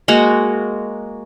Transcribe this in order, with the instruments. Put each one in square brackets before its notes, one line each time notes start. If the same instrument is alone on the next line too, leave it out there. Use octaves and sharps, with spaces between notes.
[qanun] G#3 A#3 F#4 A#5